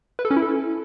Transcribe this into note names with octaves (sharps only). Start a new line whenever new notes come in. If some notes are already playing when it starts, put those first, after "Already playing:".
B4
A4
C#4
E4
A4